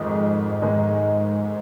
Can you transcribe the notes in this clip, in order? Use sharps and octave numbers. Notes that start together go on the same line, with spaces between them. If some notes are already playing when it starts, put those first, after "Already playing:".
Already playing: F2 G#2 D#3 G#3 D#4
D#3 G#3 D#4